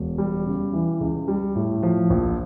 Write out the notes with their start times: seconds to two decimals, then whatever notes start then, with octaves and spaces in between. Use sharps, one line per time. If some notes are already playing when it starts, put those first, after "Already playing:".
Already playing: E1
0.18 G3
0.46 C#3
0.73 E3
1.00 C#2
1.28 G3
1.55 A2
1.83 F3
2.10 A#1